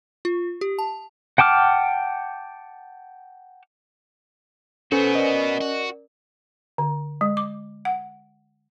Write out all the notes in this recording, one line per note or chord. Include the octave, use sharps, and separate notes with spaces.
F4
G4
A5
F#5 G5 A5 D6 F6
B3 C#4 F#4 A4 B4 C5 G#5
A#4 D5 D#5
F#4
D3
G#3
D6
F#5